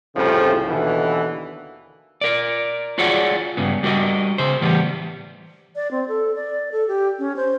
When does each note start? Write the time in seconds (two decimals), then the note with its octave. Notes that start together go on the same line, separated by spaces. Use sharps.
0.15 C2 F2 A2 C#3 F3
0.68 D#2 B2 D3 E3
2.21 A#4 D5
2.98 F4 F#4 G#4 C#5 D5 F#5
3.57 G2 C#3 B3
3.83 G3 F#4 A#4 C#5 D#5
4.38 C#3 C5
4.61 A2 E3 G3 B3
5.76 D5
5.91 C4
6.08 A4
6.35 D5
6.72 A4
6.88 G4
7.19 C#4
7.36 C5